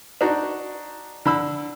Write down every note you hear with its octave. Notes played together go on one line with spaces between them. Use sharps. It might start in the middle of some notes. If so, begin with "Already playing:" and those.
D4 D#4 F#4
D3 B5 E6